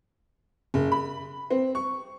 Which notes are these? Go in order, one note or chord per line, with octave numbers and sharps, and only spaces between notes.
F#1
B5
C4
C#6